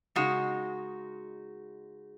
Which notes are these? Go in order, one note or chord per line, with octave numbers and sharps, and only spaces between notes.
C#3 G#3 D#4 F#4